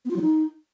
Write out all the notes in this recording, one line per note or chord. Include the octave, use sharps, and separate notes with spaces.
B3
F4
F#3
D#4